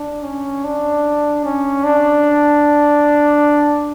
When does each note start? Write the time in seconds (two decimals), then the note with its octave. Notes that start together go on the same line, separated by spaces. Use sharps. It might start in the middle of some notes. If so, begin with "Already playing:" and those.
Already playing: D4
0.23 C#4
0.64 D4
1.44 C#4
1.84 D4